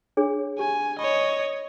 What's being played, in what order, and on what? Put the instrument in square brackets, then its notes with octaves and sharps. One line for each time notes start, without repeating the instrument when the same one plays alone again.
[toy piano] D4 G#4 C#5
[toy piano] G4 [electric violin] G#5
[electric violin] C#5 D#5 [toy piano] B5